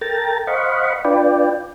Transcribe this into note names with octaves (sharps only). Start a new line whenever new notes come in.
A4 A#4 G5 A#5 A6
C5 D#5 F5 F#5 B5 C#6
D4 F4 B4 D5 G5